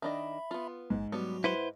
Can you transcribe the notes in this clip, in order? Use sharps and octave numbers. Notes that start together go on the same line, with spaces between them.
D#3 D4 D#5 E5 B5
B3 F4
A1 G#2
F#3 G3 B3 F#4
E4 B4 C5 F#5